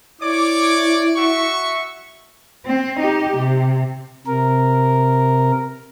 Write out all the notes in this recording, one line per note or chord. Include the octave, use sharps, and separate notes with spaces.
E4 C#5 D5 D6
F#4 E5 C#6
C4
D#4 G4
C3
C3 A#4